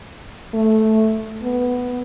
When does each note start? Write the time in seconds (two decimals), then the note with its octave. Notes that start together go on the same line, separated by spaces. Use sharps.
0.54 A3
1.43 B3